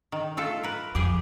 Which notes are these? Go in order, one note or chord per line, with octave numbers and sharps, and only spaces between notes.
D#3
A3 F4 A4
A#4 B4
F2 G4 G#4